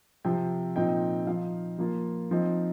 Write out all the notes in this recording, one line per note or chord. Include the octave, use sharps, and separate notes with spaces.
C3 F3 C4 G5
A#2 F3 C4 D#4 G5
F3 D#4 F5
F3 A#3 F4
F3 C4 D#4